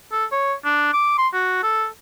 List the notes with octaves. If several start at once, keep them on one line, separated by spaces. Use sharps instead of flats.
A4
C#5
D4
D6
C6
F#4
A4